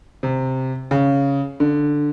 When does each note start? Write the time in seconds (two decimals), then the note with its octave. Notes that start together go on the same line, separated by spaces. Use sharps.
0.23 C3
0.91 C#3
1.60 D3